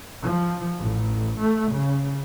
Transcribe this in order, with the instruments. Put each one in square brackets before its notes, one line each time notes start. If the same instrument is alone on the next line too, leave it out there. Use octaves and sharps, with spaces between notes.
[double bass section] F3
A1
A3
C#3